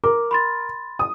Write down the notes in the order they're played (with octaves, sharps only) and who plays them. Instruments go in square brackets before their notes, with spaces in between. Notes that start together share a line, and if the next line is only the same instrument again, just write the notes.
[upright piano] A#4 [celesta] D6
[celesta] B5 C6 A6
[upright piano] D#6